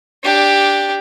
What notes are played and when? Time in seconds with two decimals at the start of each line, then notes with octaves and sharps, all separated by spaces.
0.24 D4 G4